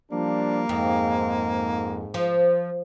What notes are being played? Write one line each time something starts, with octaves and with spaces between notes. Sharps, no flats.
F3 G3 A#3 D4
F2 G#2
F3